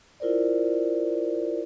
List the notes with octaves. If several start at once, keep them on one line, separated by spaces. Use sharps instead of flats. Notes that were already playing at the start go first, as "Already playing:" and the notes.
E4 F4 A#4 C5 D5